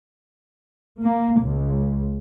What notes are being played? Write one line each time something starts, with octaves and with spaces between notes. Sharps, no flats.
A#3
C#2